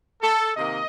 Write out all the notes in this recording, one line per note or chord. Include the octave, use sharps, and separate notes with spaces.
A4
C3 D#3 A#3 D#5